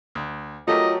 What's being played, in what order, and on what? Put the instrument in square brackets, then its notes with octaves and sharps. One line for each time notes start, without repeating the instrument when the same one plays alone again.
[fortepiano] D2
[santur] F#3 A4 [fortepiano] A3 G4 A#4 [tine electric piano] F4 [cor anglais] D#5